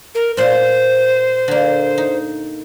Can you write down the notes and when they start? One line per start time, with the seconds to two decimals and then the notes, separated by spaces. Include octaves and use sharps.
0.15 A#4
0.37 A#2 F4 C5
1.48 D3 A#3
1.98 D#4